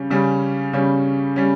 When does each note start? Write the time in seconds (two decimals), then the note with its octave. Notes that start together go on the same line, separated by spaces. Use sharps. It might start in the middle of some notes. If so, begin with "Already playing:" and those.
Already playing: C#3 G3 C#4
0.10 C#3 G3 C#4
0.73 C#3 G3 C#4
1.36 G3 C#4